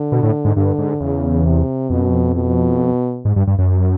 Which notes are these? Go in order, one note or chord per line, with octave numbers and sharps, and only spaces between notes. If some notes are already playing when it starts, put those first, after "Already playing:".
Already playing: D3
B2
A2
G#2
G2 D3
G#2
E2 C#3
C3
F2 B2
F#2
F2
B2
G#2
G2
G2
F#2